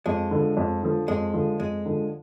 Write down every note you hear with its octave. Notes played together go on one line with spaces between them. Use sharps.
F2 G#3
D3 F3
F2
D3 F3
F2 G#3
D3 F3
F2 G#3
D3 F3